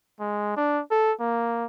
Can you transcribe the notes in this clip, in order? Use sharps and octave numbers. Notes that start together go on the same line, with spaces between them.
G#3
D4
A4
A#3